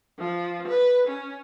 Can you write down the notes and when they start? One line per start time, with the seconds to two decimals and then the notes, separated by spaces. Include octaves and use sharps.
0.19 F3
0.67 B4
1.07 C#4